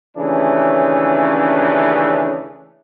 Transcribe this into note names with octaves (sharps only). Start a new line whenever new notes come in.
D#2 C#3 E3 A3 C#4 D4